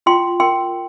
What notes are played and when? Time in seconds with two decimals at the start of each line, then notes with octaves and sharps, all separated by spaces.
0.06 F4 G5 C6
0.40 A#4 G5 C6